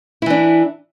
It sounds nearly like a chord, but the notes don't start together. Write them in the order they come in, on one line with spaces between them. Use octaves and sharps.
E4 E3 D4